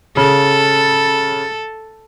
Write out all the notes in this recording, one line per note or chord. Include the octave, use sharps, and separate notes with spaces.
C#3 A4